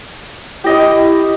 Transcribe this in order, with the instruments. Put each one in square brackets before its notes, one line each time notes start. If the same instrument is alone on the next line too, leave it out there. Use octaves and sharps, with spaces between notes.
[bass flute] E4 [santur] G4 D#5